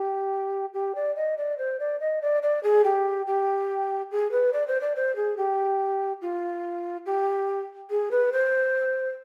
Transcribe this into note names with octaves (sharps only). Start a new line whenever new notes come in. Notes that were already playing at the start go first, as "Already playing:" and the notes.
Already playing: G4
G4
D5
D#5
D5
C5
D5
D#5
D5
D5
G#4
G4
G4
G#4
B4
D5
C5
D5
C5
G#4
G4
F4
G4
G#4
B4
C5